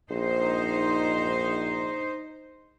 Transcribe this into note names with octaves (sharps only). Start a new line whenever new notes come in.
A#1 D#4 C5